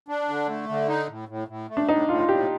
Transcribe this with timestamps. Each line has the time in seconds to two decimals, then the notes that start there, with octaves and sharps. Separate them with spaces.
0.08 D4
0.29 D3
0.48 A3
0.69 D3
0.89 D#4
1.09 A2
1.29 A2
1.48 A2
1.69 A3
1.77 D4
1.89 A2 D#4
2.08 A2 F4
2.19 F4
2.29 A2 G4